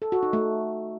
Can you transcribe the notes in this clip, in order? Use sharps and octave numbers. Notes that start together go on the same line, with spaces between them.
A4
F#4
D#4
A3